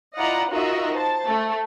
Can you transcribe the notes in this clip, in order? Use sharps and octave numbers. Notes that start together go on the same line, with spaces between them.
E4 F4 D5 D#5 F#5 A#5
D#4 F4 F#4 A#4 D#5 E5
C5 A5
A3